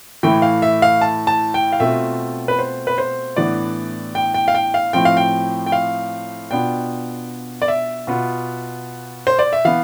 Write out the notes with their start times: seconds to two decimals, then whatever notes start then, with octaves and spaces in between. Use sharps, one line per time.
0.23 A2 E3 A3 E4 G5
0.42 F5
0.62 E5
0.82 F5
1.01 A5
1.27 A5
1.54 G5
1.72 F5
1.80 B2 A3 C4 F4 E5
2.48 B4
2.59 C5
2.87 B4
2.98 C5
3.36 A2 E3 B3 D4 D5
4.15 G5
4.34 G5
4.48 F5
4.55 G5
4.74 F5
4.93 A2 F3 C4 G5
5.05 F5
5.17 G5
5.66 G5
5.72 F5
6.51 B2 B3 D4 F4 G5
7.62 D5
7.68 E5
8.07 B2 B3 F4
9.27 C5
9.39 D5
9.53 E5
9.65 E3 B3 F5